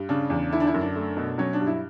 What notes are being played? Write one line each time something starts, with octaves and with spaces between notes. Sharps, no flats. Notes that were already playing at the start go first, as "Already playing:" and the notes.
Already playing: G2
C#3 D4
E2
D3 E4
D4
E4
F#2
D4
A3
B2
F#3 C#4
D4
G2
E4